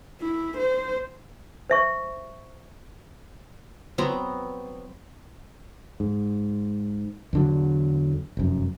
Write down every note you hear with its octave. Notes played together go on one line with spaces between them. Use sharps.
E4
C5
C5 E5 C#6
F#3 B3 C4 A#5
G#2
E2 D3 F#3
F1 F#2